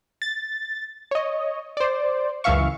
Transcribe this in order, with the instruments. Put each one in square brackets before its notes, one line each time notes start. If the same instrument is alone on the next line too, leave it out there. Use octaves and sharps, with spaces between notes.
[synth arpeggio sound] A6
C#5 D#5
C5 D5
C#2 F#2 E3 E5 F5 C#6